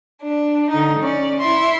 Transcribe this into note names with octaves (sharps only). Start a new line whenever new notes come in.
D4
D3 D#4
C#4 D5
E4 E5 C6